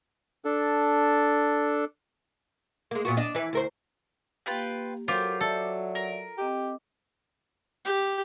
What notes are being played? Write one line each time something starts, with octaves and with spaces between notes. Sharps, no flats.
D4 A4
G#3 A#3
A#2 B3 F#4
D4 D#5
E3 B4
D2 A#4 C5
A#3 F4 G4 B4 G5
F#3 F4 G4 A4 A#4 C5 D6
A4 D5 E5
A#4
C4 G4 D#5 D6
G4